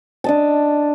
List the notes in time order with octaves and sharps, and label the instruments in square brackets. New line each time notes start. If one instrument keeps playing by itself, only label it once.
[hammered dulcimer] D4 D#5 A5